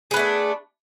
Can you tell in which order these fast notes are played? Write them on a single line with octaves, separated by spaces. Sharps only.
G#4 B3 A3 D4